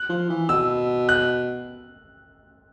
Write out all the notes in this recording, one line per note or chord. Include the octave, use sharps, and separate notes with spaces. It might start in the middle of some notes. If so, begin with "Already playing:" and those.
Already playing: F#6
F3
E3
B2 E6
F#6